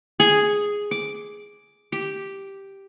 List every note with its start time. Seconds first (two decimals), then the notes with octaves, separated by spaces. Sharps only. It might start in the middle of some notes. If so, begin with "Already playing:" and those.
0.20 G#4
0.91 D6
1.92 G4